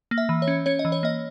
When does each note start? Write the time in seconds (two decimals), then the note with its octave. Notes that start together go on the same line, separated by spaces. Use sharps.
0.11 A#3
0.18 E5
0.29 E3
0.42 C#5
0.48 C#4
0.66 C#4 C#5
0.79 D#5
0.85 E3
0.92 C#5
1.03 A#3 D#5